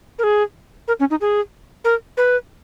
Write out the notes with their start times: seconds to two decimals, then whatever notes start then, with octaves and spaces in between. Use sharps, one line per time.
0.19 A#4
0.23 G#4
0.88 A#4
1.00 C#4
1.10 D#4
1.21 G#4
1.84 A#4
2.17 B4